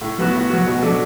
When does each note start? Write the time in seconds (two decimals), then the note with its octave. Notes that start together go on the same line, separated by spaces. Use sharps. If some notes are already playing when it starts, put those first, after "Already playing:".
0.01 A2
0.18 F#3 B3 F#4
0.34 A2
0.50 F#3 B3 F#4
0.67 B2
0.82 F#3 A3 D4